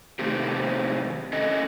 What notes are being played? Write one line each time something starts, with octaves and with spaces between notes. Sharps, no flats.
C3 D#3 A3 C4 G4
C#4 A4 D#5